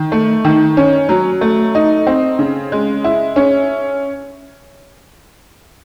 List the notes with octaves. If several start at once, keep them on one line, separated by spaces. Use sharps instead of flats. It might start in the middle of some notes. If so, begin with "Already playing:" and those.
Already playing: D#3
A3
D#3
C#4
F#3
A3
D#4
C4
C#3
G#3
E4
C#4